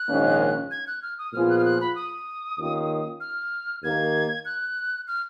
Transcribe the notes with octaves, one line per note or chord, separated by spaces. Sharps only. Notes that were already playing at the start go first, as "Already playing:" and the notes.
Already playing: F#6
A#1 G#2 D#3 A#3 C#4
G#6
F#6
F6
D#6
A#2 F3 B3 F4 G#4 F6
F#6
F6
F#6
B5
D#6
D#2 D#3 A#3 C#4 F4
F6
D#2 D#3 A#3 G#6
F#6
F6